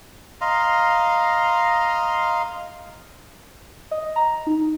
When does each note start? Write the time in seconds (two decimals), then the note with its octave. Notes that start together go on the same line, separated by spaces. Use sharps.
0.41 D#5 F5 A#5 C6
3.91 D#5
4.16 A#5
4.47 D#4